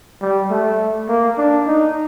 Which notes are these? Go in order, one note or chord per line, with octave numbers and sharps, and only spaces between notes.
G3
A3
A#3
D4
D#4